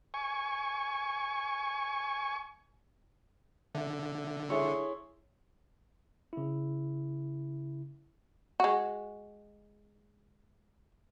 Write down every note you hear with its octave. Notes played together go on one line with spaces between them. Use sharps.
G#5 C#6
D3 E5
E4 G#4 A4 C#5 C6
C#3 E4
G#3 F#4